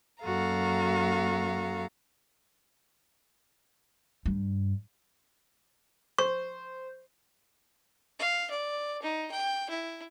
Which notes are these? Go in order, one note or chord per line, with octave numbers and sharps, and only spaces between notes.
F#2 A#3 F#4 A4 F5 A#5
G2
C5 C#6
F5
D5
D#4
G5
E4